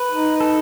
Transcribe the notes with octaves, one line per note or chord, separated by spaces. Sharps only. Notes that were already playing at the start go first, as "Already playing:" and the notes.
Already playing: B4
D#4
A4